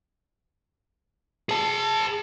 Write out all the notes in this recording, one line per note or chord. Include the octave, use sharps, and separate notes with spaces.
G#4 A5